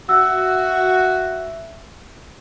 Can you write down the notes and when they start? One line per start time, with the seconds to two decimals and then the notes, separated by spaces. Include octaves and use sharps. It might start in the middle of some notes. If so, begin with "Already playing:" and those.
0.09 F#4 E5 E6